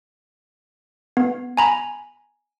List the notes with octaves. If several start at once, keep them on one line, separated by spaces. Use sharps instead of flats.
B3
G#5 A#5 B5